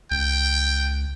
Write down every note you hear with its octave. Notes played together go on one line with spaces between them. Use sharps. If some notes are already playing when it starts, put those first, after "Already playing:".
C#2 G5